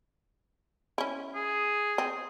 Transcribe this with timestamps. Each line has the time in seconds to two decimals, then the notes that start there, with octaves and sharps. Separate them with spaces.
0.98 C#4 E4
1.35 G#4
1.98 C4